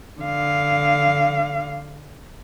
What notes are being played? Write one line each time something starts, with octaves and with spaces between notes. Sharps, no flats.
D3 F5